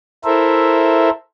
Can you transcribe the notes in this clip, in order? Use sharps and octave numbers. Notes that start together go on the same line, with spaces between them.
E4 A4 A#4 C5 E5